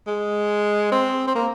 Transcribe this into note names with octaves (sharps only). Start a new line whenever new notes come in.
G#3
C4
C4
A#3